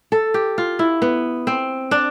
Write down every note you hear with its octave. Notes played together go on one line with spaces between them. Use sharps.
A4
G4
F4
E4
B3
C4
D4